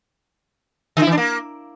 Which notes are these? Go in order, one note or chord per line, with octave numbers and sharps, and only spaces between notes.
D3
E4
E3
D4
A#3